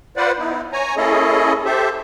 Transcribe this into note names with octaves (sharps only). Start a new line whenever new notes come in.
F4 B4 C5 D5 F#5
B3 D#4 E4
C#5 G#5 A#5
A#3 C#4 E4 G#4 A4 D#5
G4 A4 C5 E5